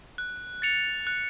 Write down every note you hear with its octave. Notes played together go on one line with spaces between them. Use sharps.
F#6
A6 C#7 F7
F#6